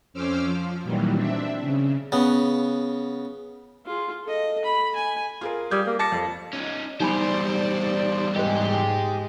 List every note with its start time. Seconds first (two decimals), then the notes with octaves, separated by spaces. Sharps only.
0.13 F2 C#4 C5 D6 E6 F6
0.45 F3
0.83 A#2 D#3 E3 F#3 G3
1.15 C4 D4 E5
1.61 C#3
2.12 C#3 B3
3.85 F4 G#4
4.24 A4 D#5
4.65 B5
4.96 G#5
5.41 F4 G#4 A#4
5.71 G3 D#6 G6 G#6
5.87 A#3
5.99 A5 D6 A#6 C#7
6.12 F2
6.53 C#4 D#4
7.00 E2 G3 D#4 C5 D5 G#5 B5
8.36 G#2 G#3 G4 C5 D#5